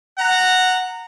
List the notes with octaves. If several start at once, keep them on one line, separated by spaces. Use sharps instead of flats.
F#5 A#5